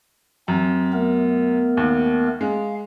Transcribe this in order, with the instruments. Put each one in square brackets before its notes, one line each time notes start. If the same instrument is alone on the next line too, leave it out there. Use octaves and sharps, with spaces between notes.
[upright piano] F#2 [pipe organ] C4
[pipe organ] A3 B3 A#4
[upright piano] D#2
[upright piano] G#3 [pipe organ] F5